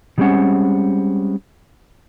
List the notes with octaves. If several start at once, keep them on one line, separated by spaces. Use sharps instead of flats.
D#3 G3 G#3 C4 C#4 F#5